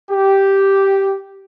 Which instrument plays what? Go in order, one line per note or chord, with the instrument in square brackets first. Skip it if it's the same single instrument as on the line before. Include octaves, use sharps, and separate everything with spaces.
[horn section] G4